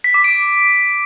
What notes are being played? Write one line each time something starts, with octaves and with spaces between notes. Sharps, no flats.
B6
D6
D7